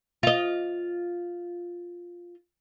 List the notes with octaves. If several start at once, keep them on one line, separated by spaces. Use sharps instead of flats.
F4 D#5